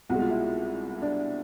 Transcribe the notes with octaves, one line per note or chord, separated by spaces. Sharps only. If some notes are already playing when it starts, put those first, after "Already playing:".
C2 B2 G#3 F#4
F4
E4
D4